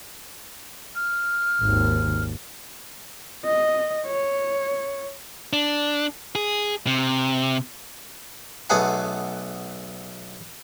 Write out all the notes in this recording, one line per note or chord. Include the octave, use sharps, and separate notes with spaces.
F6
G#1 D#2
D#5
C#5
D4
G#4
C3
B1 A3 B3 G#4 F#5 B5